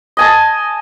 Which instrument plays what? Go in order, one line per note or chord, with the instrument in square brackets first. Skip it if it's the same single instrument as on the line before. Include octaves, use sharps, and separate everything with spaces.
[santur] D#5 G#5 A5